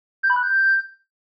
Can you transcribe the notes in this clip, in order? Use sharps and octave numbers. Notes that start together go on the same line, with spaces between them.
G6
B5
F#6
G6